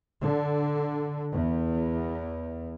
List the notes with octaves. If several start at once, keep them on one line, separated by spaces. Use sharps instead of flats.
D3
E2